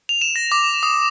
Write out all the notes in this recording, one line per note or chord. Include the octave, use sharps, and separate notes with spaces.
F7
E7
A#6
D6
D#6